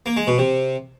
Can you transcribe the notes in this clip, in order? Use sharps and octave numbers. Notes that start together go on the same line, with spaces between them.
A#3
G#3
B2
C3